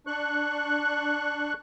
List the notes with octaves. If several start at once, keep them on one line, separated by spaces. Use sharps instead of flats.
D4 C#6 F#6